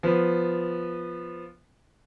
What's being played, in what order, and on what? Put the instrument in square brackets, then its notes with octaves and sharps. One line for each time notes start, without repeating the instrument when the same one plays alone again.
[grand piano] F3 B3